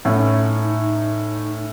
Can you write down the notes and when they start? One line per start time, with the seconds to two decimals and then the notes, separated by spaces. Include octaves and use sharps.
0.05 A2 C#4 D#4